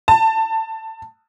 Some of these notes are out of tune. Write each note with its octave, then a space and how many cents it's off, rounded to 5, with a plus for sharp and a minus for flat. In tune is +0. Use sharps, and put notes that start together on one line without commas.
A5 +15